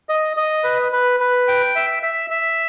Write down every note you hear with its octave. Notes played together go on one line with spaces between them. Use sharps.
D#5
D#5
B4
B4
B4
G5
E5
E5
E5